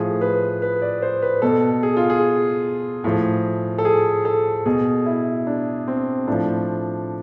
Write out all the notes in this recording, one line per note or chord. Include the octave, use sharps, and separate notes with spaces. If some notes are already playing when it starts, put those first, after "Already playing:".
Already playing: A2 F3 G#4
B4
B4
D5
C5
B4
B2 A4
G#4
F4
G#4
A2 F3
A4
G#4
A4
B2 G#4
E4
D4
C4
A2 F3 D4